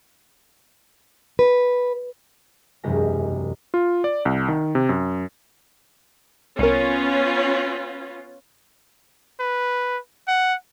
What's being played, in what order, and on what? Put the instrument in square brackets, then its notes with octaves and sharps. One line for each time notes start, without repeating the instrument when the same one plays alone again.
[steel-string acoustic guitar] B4
[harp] E1 C2 F#2 G#3 G4 A#6
[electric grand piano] F4
D5
C2
D#3
C3
F#2
[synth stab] C2 A#4 [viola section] B3 C#4 F4
[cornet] B4
F#5